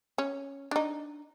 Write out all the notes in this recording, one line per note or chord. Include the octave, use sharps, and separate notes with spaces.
C#4
D4 D#4